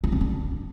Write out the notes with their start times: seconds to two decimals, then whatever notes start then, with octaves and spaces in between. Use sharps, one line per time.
0.04 D4
0.12 C#4
0.21 D4